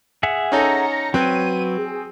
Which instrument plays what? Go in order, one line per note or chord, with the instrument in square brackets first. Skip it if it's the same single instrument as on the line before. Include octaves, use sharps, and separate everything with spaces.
[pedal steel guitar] G#4 E5 F#5
[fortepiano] C#4 D#4 A4 [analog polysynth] A#5 A#6 C#7
[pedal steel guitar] F#3 B4 C#5 [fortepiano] C4 [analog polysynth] D#7
[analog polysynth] G#4